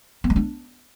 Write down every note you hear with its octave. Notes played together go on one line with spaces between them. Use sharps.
B3
G#3
D4